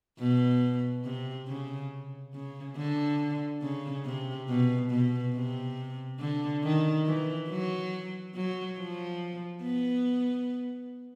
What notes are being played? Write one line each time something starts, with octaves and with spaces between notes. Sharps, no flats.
B2
C3
C#3
C#3
D3
C#3
C3
B2
B2
C3
D3
D#3
E3
F#3
F#3
F3
B3